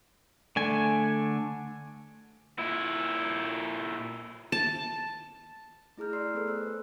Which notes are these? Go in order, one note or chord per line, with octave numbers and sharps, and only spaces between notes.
D3 A3 G#5
A#2 E4
A5
A3 E4 G#4 A#5 F6 G6
D5 C6 E6 F6 C7
A3 B3 G#4 A4 B4
C5 E6 F#6
A4 B4